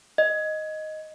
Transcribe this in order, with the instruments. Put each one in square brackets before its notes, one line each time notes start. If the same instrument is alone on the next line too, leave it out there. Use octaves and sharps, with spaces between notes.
[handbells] D#5